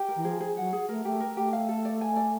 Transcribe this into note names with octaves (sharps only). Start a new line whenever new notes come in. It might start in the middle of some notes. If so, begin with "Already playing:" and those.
Already playing: G4
A#4
E3
F3 G#4
G#4
F#3 F#5
G#4
A3 A#4
A3 G4
A#4
A3 G4
F5
A4
D5
G#5
D5